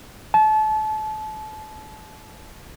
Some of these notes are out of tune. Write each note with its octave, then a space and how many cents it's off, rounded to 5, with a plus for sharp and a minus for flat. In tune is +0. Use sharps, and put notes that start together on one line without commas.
A5 -30